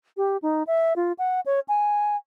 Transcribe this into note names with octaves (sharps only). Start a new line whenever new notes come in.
G4
D#4
E5
F4
F#5
C#5
G#5